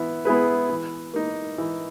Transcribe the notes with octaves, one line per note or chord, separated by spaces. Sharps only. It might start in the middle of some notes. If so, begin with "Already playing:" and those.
Already playing: E3 B3 E4
B3 E4 G#4 B4
E3
A#3 D#4
E3